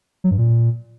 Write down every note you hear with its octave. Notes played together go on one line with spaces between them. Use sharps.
F#3
G2
A#2